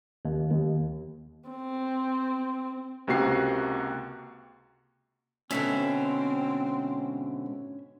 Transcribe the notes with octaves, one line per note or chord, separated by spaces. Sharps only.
D#2
D#2
C4
C#2 C3 A#3 F#4 C7
G#2 B2 D3 C4 C#4 E5